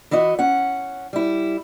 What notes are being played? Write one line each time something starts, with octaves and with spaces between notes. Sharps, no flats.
E3 E4 F#4 D#5
C#4 F#5
G3 E4